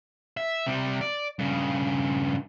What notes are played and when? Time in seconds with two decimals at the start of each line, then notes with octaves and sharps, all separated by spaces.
0.37 E5
0.67 C3 G3
1.01 D5
1.39 G2 C#3